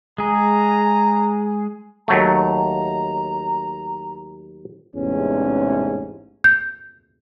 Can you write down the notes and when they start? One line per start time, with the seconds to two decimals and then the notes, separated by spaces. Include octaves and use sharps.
0.18 G#3 G#4 A#5
2.08 D#2 F#3 A3 A#5
4.95 A1 E2 G#2 C3 C#4
6.44 G6